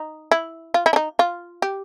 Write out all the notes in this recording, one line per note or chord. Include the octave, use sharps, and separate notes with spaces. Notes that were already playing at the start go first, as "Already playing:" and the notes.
Already playing: D#4
E4
F4
E4
D4
D#4
F4
G4